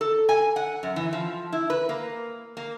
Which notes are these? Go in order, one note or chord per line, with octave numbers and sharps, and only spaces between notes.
A4
G#5
F#5
F#2
E3
F3
E4
B4
A#3
A#3